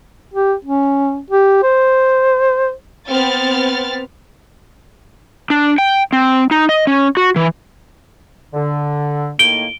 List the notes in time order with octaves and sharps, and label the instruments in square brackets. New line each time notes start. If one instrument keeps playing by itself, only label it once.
[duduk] G4
C#4
G4
C5
[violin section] B3 C4 F6 A6
[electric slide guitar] D4
G5
C4
D#4
D#5
C#4
F#4
E3
[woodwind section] D3
[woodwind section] A2 D#3 A#3 [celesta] D7 G7